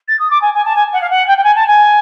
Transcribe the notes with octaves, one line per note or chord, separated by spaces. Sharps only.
A6
D#6
D6
G#5
G#5
A5
G#5
F#5
F5
F#5
G5
G5
G#5
A5
G#5